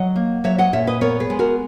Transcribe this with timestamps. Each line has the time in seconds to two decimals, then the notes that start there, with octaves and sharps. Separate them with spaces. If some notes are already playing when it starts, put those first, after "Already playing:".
Already playing: F#3 D#5 F#5
0.16 A#3
0.44 F#3 C#5 E5
0.58 D#5 F#5
0.73 A#2 C#5 E5
0.87 B4 D#5
1.01 B3 A#4 C#5
1.20 G#4 B4
1.30 G#3
1.39 F#4 A#4